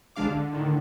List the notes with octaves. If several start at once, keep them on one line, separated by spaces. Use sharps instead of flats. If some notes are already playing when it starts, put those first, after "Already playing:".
A1 D2 G#3 D4 F5 D6
D3
A2 D3 D#3